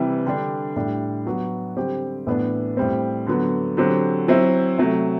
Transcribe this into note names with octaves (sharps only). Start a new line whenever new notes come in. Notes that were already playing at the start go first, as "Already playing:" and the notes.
Already playing: C3 E3 G3
D3 G3 D4
A2 G3 D4
F#3 B3 F#4
D3 G3 C4 G4
A2 E3 B3 D4
A2 G3 C4
D3 F#3 B3
D3 F#3 C4 G4
F#3 C4 E4
C3 F#3 A3